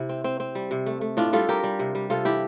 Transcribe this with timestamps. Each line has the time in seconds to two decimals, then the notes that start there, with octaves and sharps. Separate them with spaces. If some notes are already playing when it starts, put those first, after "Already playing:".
Already playing: C3 E4
0.09 C4
0.24 C4
0.40 C4
0.55 G3
0.71 C3
0.86 A3
1.01 A3
1.17 A2 D4 F4
1.33 G3 F4 A4
1.48 G3 G4 A#4
1.64 G3
1.79 C3
1.95 G3
2.10 C3 F4 A4
2.25 E3 E4 G4